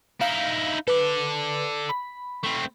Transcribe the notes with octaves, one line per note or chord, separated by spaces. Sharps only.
D#4 E4 F5
A4 B4 D5
B5
A3 C4